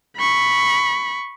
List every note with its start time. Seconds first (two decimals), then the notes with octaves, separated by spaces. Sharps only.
0.18 B5 C#6